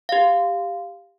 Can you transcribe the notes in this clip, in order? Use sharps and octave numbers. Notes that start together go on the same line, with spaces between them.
G4 F5